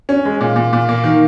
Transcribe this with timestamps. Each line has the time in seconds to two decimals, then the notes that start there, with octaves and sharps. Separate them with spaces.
0.09 C#4
0.25 G#3
0.40 A#2
0.56 A#2
0.73 A#2
0.89 A#3
1.04 D#3